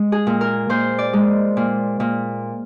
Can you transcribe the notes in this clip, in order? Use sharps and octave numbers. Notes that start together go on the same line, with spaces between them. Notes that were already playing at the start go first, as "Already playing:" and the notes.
Already playing: G#3
G#4
A#2
A#4
A#2 C5
D5
G#3
A#2
A#2